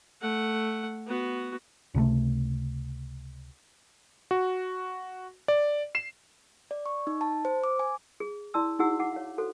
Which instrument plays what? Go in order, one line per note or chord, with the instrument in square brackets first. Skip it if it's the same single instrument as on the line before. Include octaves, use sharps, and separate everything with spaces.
[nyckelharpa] A3 F#5
B3 F#4
[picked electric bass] C#2 C3 D#3 A3
[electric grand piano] F#4
D5
C7 E7
[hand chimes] D5
C#6
D#4
A5
C5
D6
G#5
[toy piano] G#4
E4 D5 A5 C6 E6
D#4 E4 F#4 G#4 F#5 E6
F#5 D6
C#5 F5
F#4 A4 C5